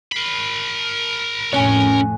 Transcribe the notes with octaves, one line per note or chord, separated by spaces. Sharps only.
A#4 B5 B6 C7 G7
F1 A2 C#4 C#5 G#5 F#6